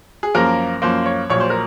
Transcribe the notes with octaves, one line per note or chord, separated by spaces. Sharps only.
G#4
F#2 F3 A#3 A#4
F#2 F3 A#3 C5
C#5
A#1 A#2 F#3 C#5
C5
A#4